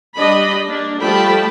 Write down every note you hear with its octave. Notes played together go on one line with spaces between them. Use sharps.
G3 D4 D#5 B5
A#3 D4
F3 G3 A3 G5 A5 B5